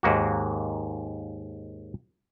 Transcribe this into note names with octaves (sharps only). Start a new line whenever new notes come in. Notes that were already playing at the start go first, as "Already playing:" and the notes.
D#2 G#2 A#3 F#4